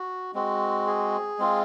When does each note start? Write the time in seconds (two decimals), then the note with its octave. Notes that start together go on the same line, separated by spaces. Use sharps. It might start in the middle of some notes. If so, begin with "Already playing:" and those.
Already playing: F#4
0.34 G#3 C4 F#4
0.87 G#4
1.39 G#3 C4 F4